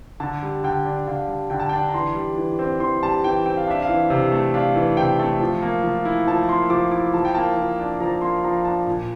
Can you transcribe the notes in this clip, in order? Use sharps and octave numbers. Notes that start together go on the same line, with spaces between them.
D3 A5
G3
D3 G5
D4
D3 F5
G3
D3 G5
A5
D4 G5
A#5
E3 C6
G3
E3
C4
E3 C6
G3 A5
E3 G5
C4 G5
F5
D4 E5
F5
E3
C3
A3
D4 F5
E3
C3 G5
A3
F3
A#3
F3
E4
F3 A5
A#3 C6
F3 D6
E4 D6
F3 A5
G5
A#3 A5
F3
D4
F3 A#5
A#3 C6
F3 A#5
D4 A5
A#2